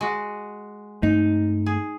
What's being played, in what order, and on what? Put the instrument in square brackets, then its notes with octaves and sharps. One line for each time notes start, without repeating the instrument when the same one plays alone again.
[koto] G#3 F#4
[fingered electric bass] G2 A3 C4 [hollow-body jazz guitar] D#4
[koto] G#4